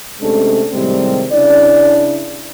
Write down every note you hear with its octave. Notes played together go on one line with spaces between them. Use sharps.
C3 G#3 A3 C#4 D4 A4
A2 C3 D#3 G3 G#3 C4
C#3 D4 E4 D5